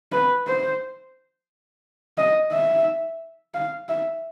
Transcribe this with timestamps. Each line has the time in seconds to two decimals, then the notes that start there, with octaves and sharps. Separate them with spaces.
0.12 B4
0.47 C5
2.18 D#5
2.52 E5
3.54 F5
3.89 E5